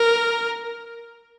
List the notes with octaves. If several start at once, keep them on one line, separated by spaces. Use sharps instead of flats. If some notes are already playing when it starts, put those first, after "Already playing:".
Already playing: A#4